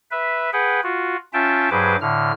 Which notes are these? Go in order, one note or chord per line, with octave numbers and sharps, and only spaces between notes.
B4 E5
G#4 B4 F#5 G5
F4 F#4
C#4 F4 E5 G5 A5
G2 F#3 G#4 B4 C5 D6
A2 D3 F6